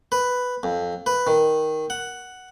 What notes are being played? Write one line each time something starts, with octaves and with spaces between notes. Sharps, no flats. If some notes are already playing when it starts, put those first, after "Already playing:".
B4
F2
B4
D#3
F#5